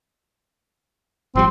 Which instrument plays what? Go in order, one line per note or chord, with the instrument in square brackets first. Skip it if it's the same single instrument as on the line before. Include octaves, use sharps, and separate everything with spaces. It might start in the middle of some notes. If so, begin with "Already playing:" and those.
[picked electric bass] G#1 F3 G3 [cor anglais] C4